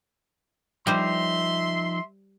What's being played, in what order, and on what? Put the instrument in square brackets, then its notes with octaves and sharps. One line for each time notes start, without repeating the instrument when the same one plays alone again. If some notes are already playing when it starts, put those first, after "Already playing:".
[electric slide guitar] F3 D#4 [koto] G3 C5 [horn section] E5 C6